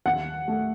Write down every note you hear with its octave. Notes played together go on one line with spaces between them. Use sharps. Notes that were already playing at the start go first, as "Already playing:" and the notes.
D#2 F#5
A3